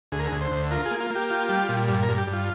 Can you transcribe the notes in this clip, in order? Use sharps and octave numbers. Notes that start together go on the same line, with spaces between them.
D2 G#4
A#4
G#4
D2
C5
D2
F4 A#4
G#4
A#3
F4
A#3
G4
F4
G3
A#2
G2
A#4
G2
G4
G2
F4